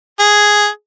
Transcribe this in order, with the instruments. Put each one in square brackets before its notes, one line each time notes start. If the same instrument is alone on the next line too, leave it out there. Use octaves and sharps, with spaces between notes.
[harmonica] G#4